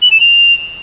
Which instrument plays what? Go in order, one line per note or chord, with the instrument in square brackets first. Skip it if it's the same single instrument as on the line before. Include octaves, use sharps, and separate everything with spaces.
[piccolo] F#7
E7
F7